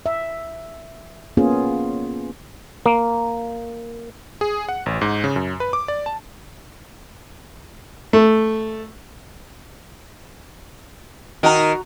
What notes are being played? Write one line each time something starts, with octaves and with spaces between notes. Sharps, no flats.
E5
A#3 B3 C#4 F4 G#4
A#3
G#4
F#5
A1
G#2
C#3
F#2
B4
D6
D5
A5
A3
D#3 D#4 F#4 A#4 A#5